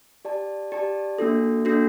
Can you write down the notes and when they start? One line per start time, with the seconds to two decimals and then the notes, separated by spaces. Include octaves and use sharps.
0.25 G4 D5 A5
0.72 G4 D5 A5
1.18 A#3 D4 F#4 A4
1.65 A#3 D4 F#4 A4